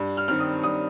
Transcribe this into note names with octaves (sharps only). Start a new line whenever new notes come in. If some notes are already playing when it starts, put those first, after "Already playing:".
Already playing: G2
F6
D#3 G3 C4 F6
D#6
G2 D#6